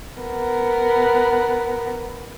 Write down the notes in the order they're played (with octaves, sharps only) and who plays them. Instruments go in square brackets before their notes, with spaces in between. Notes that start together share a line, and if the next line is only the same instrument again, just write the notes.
[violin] B3 A#4